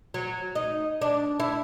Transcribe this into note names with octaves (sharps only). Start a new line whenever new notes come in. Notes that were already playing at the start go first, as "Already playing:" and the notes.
F#3
D#4
D4
E4